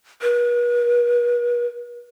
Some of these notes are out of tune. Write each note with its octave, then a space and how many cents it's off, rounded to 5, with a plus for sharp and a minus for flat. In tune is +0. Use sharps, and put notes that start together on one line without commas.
B4 -45